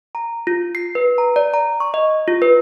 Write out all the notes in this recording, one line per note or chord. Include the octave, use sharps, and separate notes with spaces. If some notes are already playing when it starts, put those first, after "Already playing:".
A#5
F4
C7
B4
A#5
D5
A#5
C#6
D#5
F4
B4